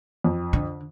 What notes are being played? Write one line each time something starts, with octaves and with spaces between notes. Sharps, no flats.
F2
D3